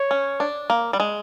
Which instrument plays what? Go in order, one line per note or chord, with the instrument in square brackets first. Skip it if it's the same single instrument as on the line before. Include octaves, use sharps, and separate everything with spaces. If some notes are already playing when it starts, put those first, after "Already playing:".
Already playing: [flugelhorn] C#5
[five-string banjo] C#4
D4
A#3
G3
G#3